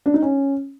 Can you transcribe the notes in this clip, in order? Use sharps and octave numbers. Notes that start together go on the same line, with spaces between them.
D4
D#4
C#4